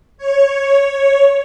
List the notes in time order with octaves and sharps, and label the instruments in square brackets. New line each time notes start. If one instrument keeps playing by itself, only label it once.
[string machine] C#5